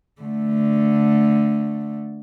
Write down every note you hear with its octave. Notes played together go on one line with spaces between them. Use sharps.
D3 A3